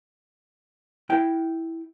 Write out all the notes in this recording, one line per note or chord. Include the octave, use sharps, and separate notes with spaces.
E4 G5